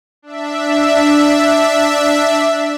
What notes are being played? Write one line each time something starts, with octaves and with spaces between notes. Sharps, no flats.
D4 E5